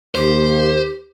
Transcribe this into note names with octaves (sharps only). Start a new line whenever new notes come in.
D#2 G4 C5